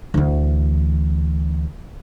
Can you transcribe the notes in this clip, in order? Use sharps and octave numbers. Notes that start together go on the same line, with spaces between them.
D2 E3